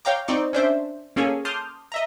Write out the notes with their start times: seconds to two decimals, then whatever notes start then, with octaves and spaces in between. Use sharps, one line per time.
0.05 C#5 F5 G5 A#5 D6
0.28 C4 D#4 D5 C#6
0.53 C#4 D4 C5 E5
1.16 A#3 C#4 G#4 A4 C#5 G#5
1.45 A5 C6 D6 D#6 F6 G6
1.92 D#5 E5 A#5